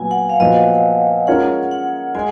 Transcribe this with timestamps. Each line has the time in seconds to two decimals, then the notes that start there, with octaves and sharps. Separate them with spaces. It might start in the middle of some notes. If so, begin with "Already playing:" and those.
Already playing: A#2 F#3 B3 G#5
0.11 F#5
0.29 F5
0.40 A#2 F3 B3 F#4 D#5
1.27 G#3 C#4 F4 A#4 C#5 F#5
1.71 F#5
2.15 G#3 G#5